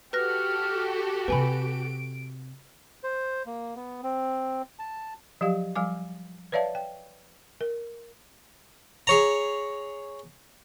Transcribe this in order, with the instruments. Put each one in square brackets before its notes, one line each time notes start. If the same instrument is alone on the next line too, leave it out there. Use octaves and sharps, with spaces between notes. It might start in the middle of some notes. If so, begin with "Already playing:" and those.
[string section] F#4 G4 A4 [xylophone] B4 F#6 A#6 [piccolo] F6
[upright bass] C3 C4 [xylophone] B4 G#5 B5 [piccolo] D7
[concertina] C5
A#3
B3
C4
A5
[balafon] F3 F#3 G4 F5
F3 G3 F5 G#5 D6
B4 C#5 D5 E5 F5 A5
G5
A#4
[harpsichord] G#4 C#5 A#5